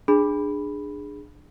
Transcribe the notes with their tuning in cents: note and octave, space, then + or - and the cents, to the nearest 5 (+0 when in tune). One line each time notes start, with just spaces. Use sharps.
D4 +15 G#4 -5 B5 +0